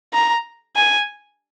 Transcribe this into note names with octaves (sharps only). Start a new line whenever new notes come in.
A#5
G#5